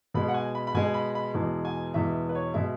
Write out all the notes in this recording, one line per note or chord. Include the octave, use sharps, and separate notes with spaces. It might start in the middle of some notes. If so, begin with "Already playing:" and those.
B2 G#3 B5
F#5
G#5
B5
B5
B2 G#3 G#5
B5
B5
E2 B2 G#3
G#5
E2 B2 G#3 E5
B4
C#5
B2 G#3 E5